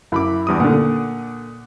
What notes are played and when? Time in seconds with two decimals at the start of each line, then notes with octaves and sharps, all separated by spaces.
0.12 F#2 E4 B5 D6
0.47 E2 G2 D#6
0.60 A#2 D3 F#5